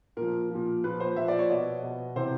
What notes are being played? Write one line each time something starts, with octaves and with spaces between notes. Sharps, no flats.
A#2 F3 A#4
A#2 F3
A#2 F3 B4
C5
A#2 F3 E5
D5
C#5
B2 D#5
B2
C3 E3 C5